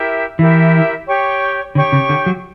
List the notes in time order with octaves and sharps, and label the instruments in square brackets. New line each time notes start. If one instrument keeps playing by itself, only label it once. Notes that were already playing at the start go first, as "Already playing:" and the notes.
Already playing: [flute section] E4 G4 A#4 E5
[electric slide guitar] E3 [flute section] E4 G4 A#4 E5
[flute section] G4 C#5 G5 C#6
[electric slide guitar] D3 [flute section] G4 C#5 G5 C#6
[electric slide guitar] C#3
D3
F#3